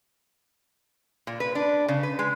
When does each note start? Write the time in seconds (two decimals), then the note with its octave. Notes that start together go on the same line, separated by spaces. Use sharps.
1.27 A#2
1.40 B4
1.55 D4
1.88 C#3
2.03 B4
2.19 G#3